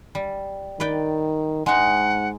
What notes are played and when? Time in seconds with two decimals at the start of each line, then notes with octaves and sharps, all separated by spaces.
0.15 G3
0.80 D#3 B4 D5 G5
1.66 G#2 G#3 D#4 F#5